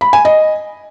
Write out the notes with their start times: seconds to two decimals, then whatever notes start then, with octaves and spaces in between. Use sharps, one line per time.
0.01 B5
0.13 G#5
0.25 D#5